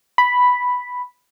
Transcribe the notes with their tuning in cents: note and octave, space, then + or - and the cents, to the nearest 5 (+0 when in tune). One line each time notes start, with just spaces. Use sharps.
B5 +0